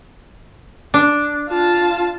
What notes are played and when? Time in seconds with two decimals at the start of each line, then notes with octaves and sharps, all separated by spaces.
0.94 D4
1.50 F4 A5